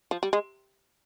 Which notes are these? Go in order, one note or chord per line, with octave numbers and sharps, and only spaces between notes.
F3
G3
G#3